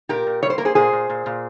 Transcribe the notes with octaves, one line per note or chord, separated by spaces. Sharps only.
A#2 G4 A#4
A#2
G3 C#5
C5
A#3 A#4
G#4 C5
A#2 G#4 C5
A#2
A#2
A#2